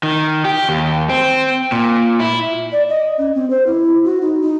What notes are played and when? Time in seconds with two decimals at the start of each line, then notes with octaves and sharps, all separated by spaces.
0.03 D#3
0.45 G4
0.69 D#2
1.10 C4
1.72 A#2
2.20 E4
2.72 D5
2.89 D#5
3.18 C#4
3.35 C4
3.50 C5
3.67 E4
4.05 F#4
4.22 D#4
4.42 D#4